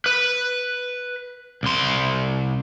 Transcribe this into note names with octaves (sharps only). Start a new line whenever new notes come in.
B4
C2 C6